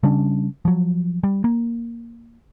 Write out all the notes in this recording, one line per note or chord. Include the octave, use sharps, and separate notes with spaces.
C#3 G3 C#4 D4
F3 F#3
G3
A#3